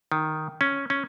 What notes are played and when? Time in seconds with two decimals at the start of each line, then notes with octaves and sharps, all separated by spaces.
0.12 D#3
0.61 C#4
0.90 C#4